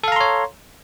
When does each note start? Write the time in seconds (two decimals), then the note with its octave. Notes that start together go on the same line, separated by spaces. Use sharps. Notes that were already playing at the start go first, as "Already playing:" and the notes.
0.04 A4
0.08 F5
0.12 A#5
0.16 C6
0.21 C#5